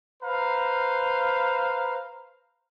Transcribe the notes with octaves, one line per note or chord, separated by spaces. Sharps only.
B4 C5 F5 A#5